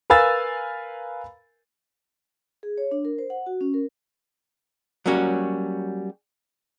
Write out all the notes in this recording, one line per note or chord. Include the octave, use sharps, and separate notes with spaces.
A#4 B4 F5 G#5 E6 A6
G#4
C#5
D4
A#4
C5
F#5
F#4
C#4
A#4
F#3 G3 A#3 C#4 F#4